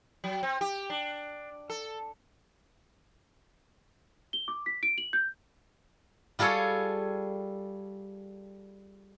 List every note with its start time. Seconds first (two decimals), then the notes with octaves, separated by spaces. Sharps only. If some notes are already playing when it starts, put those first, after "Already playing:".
0.24 F#3
0.43 C4
0.61 G4
0.90 D4
1.70 A4
4.33 G7
4.48 D6
4.66 B6
4.83 D7
4.98 F#7
5.13 G6
6.39 G3 F4 G#4 A4 C#5